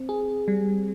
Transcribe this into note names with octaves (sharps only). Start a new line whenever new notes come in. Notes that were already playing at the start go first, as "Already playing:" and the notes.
Already playing: C4
G#4
G3